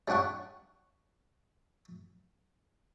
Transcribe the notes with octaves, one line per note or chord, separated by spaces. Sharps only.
G3 C#4 D4 F#5 C#6